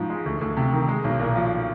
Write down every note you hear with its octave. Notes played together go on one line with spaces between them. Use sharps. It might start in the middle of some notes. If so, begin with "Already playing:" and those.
Already playing: G#2 F3 C#4
G#3
D2
D2
C3
D#3
G#3
B1
A#2
F3